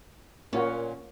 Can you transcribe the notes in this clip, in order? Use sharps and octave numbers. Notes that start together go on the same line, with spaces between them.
A#2 A#3 C#4 F4 F#4